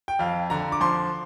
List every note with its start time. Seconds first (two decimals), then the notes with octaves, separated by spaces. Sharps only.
0.08 G5
0.19 F2 F5
0.50 D3 A#5
0.72 D6
0.81 F3 C6